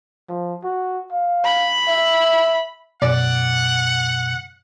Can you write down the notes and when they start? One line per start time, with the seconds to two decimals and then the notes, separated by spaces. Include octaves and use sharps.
0.29 F3
0.64 F#4
1.12 F5
1.44 B5
1.88 E5
3.02 F#2 B2 D5 F#5